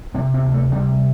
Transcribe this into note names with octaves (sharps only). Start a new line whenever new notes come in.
C3 C4
C4
D2
A3
C3 G3